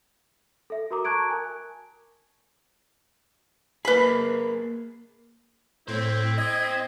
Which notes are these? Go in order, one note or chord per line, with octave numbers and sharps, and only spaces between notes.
A4 E5
F#4 A#4 A#5 D6
A5 A#5 C#6 F#6 G#6 D7
A#4 G#5
A#3 G#4 B4 B5
A2 C4 E4 C5
D#5 G#6